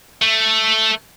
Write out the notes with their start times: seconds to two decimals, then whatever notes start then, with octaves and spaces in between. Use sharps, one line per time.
0.22 A3